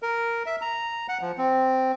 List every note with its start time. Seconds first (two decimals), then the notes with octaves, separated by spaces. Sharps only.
0.02 A#4
0.46 E5
0.62 A#5
1.09 F#5
1.21 F3
1.38 C4